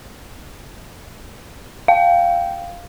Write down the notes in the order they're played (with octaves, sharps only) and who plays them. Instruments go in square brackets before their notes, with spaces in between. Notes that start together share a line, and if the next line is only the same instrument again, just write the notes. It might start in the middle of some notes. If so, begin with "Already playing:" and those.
[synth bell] F5 [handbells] G5